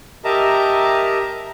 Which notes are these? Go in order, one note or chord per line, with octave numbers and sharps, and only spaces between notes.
G4 A#4 D#5 E5 A5 A#5